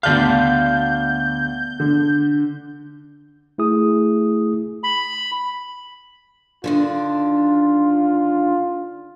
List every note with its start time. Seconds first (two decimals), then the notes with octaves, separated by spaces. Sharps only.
0.03 D2 B3 D5 F5 A5 F6 G6
1.80 D3
3.58 A3 E4 G#4 D#6
4.84 B5
6.64 D3 D#3 D4 F4